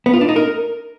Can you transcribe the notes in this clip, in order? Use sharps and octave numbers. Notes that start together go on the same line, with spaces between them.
B3
F4
D4
D#4
A#4